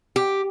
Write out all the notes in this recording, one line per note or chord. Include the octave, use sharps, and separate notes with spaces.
G4